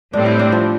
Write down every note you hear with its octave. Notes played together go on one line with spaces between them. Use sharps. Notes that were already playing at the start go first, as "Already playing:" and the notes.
A2 G3 C4 D4
E4
D4
F3